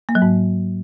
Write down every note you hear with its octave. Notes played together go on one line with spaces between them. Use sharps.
A#3
F#3
G#2